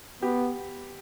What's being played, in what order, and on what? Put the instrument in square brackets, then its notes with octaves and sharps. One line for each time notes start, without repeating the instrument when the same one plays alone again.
[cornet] B3 [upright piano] G4